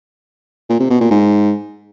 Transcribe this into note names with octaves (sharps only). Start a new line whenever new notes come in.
A#2
C3
B2
A#2
G#2